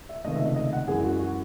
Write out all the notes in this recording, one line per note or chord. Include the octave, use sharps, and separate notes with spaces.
E5
C#2 C3 D#3 A3 D#5
E5
D#5
D#5
F#5
F#2 E3 G#3 G#4
F#4
F#4